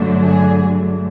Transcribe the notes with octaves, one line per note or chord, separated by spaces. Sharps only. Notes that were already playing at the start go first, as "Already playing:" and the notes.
Already playing: G2 D3 F#3 A3 D4
G#4